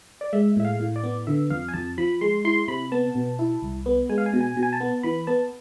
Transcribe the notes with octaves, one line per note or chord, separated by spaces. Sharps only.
D5
G#3 E5
A2 E5
F5
A2
D5
B3
D3 E5
F2 F5
G#5
F2 A5
F3 B5
G#3 C6
E4 C6
C3 B5
B3 A5
B2
E4
C2
B3
G#3 G#5
F5
G#5
B2
G#5
B2
G#5
A5
B3
E3 B5
B3 A5